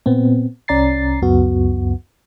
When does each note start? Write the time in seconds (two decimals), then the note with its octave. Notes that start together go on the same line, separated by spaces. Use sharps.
0.06 A#2 B3 C4
0.68 C2 C#4 D5 A#5 A6 C7
1.22 C#2 F#2 B3 F#4